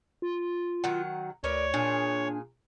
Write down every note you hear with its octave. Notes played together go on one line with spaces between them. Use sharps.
F4
D#3 F#3 F#5
D2 A#4 B4 C#5 D5
A#2 D4 G#4